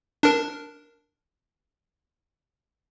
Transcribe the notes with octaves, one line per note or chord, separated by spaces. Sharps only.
D4 A#4